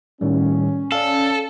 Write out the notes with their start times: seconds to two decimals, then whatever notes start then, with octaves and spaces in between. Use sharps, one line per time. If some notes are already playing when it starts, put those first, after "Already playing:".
0.21 A2 D#3 G3 C#4
0.92 A4 D5 F5